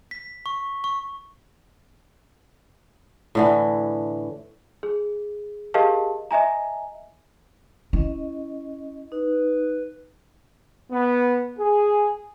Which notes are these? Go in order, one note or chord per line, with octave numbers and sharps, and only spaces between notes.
B6
C#6
C#6
A2 D3 E3
G#4
G4 G#4 A#4 D#5 F5 A5
D#5 E5 G#5 A#5
C#4 E4 D#5
D#4 B4
B3
G#4